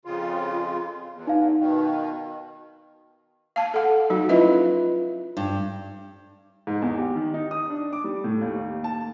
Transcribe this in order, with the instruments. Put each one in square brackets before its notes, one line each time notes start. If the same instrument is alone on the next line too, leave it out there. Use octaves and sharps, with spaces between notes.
[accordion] F2 C#3 F4
E2
[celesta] D#4 F5
[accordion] B2 D#3
[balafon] F5 A5
A4 F#5
F#3 D#4 F#4
[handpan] C#4 F4 B4 [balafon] E4 D#5 E5
[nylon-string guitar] G2
[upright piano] G#2
E2
G4
D#3
D#4
D#6
D4
D6
G3
A2
D#2
A5